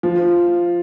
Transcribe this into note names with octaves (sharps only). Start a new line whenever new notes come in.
F3